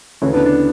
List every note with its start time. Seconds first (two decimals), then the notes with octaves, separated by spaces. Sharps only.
0.22 D2 C#3 E3 C#4 E4
0.34 B3 D4
0.46 B3 D4